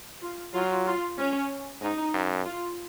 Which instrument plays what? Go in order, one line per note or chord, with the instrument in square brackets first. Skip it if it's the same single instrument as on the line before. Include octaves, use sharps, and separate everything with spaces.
[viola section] F4
[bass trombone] F#3 [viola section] F4
[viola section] F4
C#4
[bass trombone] G#2 [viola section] D#4
[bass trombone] F#2
[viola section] F4